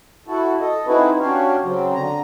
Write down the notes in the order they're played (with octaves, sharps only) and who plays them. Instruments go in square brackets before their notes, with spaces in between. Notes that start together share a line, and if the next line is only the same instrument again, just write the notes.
[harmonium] E4 F#4 A4
A4 D#5
C4 D#4 E4 F#4 G#4 B4
C#4 D4 F#4 G4 C#5 F5
C#3 F#3 C4
D3 A#5